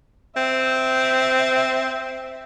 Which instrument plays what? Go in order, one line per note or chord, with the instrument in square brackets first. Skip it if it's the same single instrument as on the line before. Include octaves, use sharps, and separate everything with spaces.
[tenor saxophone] C4 [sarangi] E5